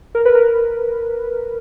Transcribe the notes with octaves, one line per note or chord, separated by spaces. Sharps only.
A#4
B4
A#4